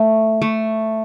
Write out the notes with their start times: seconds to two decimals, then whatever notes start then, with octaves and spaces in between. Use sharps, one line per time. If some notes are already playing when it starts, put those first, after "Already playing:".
Already playing: A3
0.42 A3